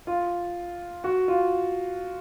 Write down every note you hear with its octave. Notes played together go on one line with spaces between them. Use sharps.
F4
F#4
F4